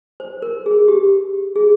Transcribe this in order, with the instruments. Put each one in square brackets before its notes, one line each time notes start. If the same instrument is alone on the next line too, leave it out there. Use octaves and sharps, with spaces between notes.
[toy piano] C5
A#4
G#4
G4
G#4